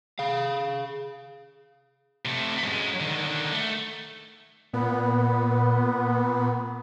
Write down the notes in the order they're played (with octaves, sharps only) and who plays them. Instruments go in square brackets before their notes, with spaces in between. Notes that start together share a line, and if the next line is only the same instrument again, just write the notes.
[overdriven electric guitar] G#4 F5
[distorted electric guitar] C3 A3
F#2 G#3
D3 D#3
A3
[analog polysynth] A#2 B3